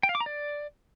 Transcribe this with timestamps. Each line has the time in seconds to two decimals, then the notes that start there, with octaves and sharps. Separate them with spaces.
0.03 G5
0.09 F5
0.15 D6
0.20 A#5
0.26 D5